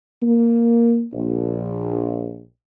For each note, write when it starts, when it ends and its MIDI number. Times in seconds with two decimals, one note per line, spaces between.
0.23 1.05 58
1.13 2.44 34